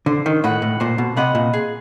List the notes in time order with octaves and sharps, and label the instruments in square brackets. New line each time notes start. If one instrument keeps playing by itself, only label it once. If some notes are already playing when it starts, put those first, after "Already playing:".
[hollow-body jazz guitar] D3 [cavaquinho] C5
[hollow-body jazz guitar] D#3
[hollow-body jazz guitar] A2 [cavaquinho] D#5 F#5 B5
[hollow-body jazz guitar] A2
[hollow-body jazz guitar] A#2 [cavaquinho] C5
[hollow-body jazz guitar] B2
[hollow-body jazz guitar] C3 [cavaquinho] D#5 F#5 B5
[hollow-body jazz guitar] A#2
[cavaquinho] G#4